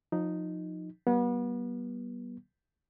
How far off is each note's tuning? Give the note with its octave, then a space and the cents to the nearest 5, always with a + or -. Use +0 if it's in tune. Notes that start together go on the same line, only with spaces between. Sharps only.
F3 +30 D#4 +0
G3 -45 B3 -35